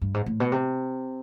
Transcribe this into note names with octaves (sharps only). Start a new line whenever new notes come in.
G2
G#2
A2
B2
C3